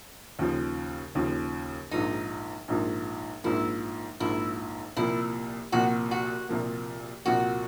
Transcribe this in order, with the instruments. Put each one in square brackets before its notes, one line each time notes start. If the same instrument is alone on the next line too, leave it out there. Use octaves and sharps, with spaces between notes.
[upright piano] D#2 C#3 F3
D#2 C#3 F3
[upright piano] A#1 G#2 F3 A#3 [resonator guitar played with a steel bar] D#4
[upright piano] A#1 G#2 F3 A#3
[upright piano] A#1 G#2 F3 A#3 [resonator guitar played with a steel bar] E4
[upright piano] A#1 G#2 F3 A#3 [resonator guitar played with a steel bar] E4
[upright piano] C2 A#2 F3 A#3 [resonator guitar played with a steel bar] E4
[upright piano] C2 A#2 F3 A#3 [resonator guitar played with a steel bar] F#4
[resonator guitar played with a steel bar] F#4
[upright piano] C2 A#2 F3 A#3
[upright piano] C2 A#2 F3 A#3 [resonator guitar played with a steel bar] F#4